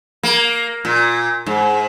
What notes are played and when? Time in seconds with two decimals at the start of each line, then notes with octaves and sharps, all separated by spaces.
0.23 A#3
0.85 A#2
1.46 G#2